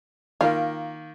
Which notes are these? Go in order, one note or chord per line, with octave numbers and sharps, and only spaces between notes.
D#3 A#3 F4